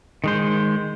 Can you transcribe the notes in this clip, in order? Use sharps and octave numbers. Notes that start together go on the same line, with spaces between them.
D#3 G#3 C5